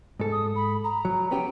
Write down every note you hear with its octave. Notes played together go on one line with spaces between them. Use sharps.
G#2 A4
D#6
B5
A#5
F#3
B3 C#4 G4 G5